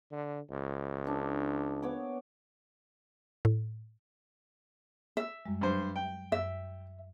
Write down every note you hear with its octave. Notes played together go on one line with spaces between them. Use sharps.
D3
C#2
D4 G#4
B3 C#5 D6
A2
E5
F#2 G3 G#3
G2 F#3 C5
G5
F#2 E5